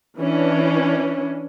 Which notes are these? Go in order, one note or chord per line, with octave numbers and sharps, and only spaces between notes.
E3 C#4 D4